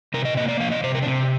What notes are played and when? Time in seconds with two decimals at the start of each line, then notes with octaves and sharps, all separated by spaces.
0.14 C3 A#4
0.25 D#5
0.37 A#3 D#5
0.48 D5
0.60 F3 F5
0.72 D#5
0.84 C3 C5
0.95 A#4
1.03 D4
1.06 C3 C4